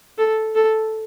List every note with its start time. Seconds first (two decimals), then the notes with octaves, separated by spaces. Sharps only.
0.18 A4
0.55 A4